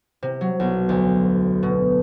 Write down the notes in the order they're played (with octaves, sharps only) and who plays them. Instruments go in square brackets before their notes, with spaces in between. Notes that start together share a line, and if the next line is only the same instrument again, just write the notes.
[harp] C3
F#3
B1
D2
B2